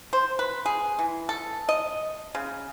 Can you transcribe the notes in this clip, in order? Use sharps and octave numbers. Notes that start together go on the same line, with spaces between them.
C5
B4
G#4
E3
A4
D#5
C#3